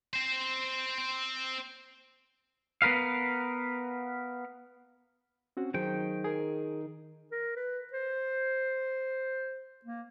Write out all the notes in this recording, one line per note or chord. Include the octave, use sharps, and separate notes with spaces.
C4 C5
B3 A#4 B4 F5
C4 C#4 F#4
D#3 F#3 G#4 C5 G5
G#4 A#4
A#4
B4
C5
A#3